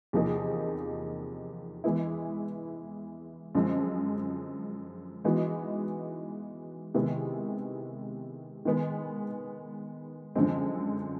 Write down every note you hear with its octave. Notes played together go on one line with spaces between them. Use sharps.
E2 C3 F3 A#3 D#4
E3 G#3 B3 E4
F#2 D3 F3 G#3 C4
E3 G#3 B3 D#4 F#4
C3 D#3 G#3 B3 E4
D#3 G#3 B3
F#2 D3 F3 G#3 C4